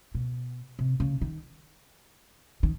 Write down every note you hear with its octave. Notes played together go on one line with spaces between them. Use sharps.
B2
C3
C#3
D#3
D#3